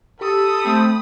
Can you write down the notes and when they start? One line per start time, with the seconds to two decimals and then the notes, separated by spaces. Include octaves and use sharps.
0.21 G4 A4 B5 D#6
0.65 A3 C4